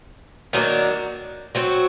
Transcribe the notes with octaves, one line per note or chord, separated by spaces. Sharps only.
D#3 F#3 A#3 D4
F#3 C4 F#4